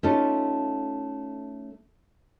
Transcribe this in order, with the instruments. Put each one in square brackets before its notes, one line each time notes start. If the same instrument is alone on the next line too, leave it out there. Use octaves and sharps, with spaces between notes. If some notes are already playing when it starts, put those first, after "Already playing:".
[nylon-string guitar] A3 C#4 D#4 F4 A4